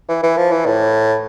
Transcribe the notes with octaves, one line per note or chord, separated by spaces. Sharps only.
E3
E3
F3
E3
A2